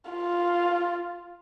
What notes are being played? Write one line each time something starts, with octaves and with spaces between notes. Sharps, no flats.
F4